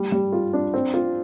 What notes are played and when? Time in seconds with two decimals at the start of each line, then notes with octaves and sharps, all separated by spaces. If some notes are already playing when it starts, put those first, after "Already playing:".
Already playing: G3
0.12 G3
0.32 F4
0.53 D4
0.74 C4
0.94 F4